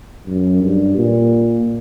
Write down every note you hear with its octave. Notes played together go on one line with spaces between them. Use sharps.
F#2
G2
A#2